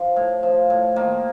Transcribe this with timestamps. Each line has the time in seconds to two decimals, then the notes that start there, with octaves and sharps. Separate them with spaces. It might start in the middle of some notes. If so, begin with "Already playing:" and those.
Already playing: F3 D4
0.16 A2
0.43 F3
0.70 A2
0.96 D#3 A#3